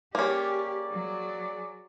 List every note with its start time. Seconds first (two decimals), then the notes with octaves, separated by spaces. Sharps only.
0.15 A#3 C#4 G4 G#4 D5
0.91 F#3